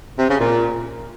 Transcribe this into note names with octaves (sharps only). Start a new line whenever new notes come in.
C3
C#3
A#2